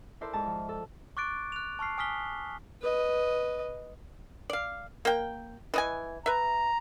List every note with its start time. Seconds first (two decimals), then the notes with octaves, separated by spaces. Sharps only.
0.21 E4 A4 A#4 C5 D5
0.33 G#2 A5 A#5
0.46 F3
0.69 A4
1.17 C#6 D6 F#6 A6 D7
1.52 F#6 F7
1.79 A5 C#6 F6 C7
1.98 G#5 D#6 F6 B6 G7
2.82 B4 D#5
4.50 D5 F5
5.05 A#3 G5
5.74 E3 D#5 G#5
6.26 B4 E5 A#5